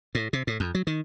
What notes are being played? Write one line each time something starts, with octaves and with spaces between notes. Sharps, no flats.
A2
C3
A2
F2
F#3
D#3